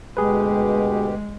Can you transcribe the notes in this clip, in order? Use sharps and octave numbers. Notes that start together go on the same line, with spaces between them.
D2 B2 G#3 G4 G#4 B4